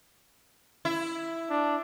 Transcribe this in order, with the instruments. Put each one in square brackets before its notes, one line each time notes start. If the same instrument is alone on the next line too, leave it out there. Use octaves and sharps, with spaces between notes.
[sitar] E4
[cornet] D4